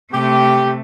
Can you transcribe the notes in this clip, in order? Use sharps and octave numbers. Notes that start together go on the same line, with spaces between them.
C3 A3 G4